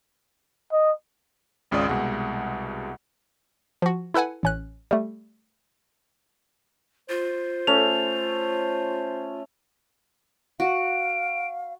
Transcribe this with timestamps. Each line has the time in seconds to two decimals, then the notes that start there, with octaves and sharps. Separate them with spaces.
0.72 D#5
1.71 G#1 C#2 C#3 F4 D5 D#6
1.89 C2 B2 G#3 F#5
3.82 F3 F#4
4.14 E4 A4 B4 F#5 G#5
4.43 A1 C#4 F#6
4.91 G3 A3
7.09 F4 C5
7.67 A3 C#4 F7
10.60 F#4 F5 D7